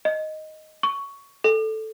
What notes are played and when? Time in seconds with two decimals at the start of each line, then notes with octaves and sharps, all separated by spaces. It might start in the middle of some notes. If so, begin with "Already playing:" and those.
0.05 D#5
0.83 C#6
1.44 A4